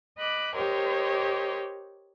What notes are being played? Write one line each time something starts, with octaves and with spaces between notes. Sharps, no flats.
D#5 B5 D6 F#6
G4 A#4 C5 C#5 D#5